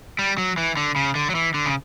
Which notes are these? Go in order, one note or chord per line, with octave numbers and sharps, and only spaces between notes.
G3
F#3
E3
D3
C#3
D3
F#3
E3
D3
C#3